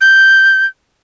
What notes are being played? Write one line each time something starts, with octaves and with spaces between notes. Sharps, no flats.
G6